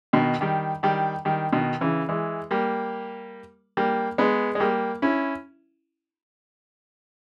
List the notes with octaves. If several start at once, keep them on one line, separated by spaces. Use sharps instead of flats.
B2 D#3
D#3 G3
D#3 G3
D#3 G3
B2 D#3
C#3 E3
E3 G#3
G3 A#3
G3 A#3
G#3 B3
G#3
G3 A#3
C#4 E4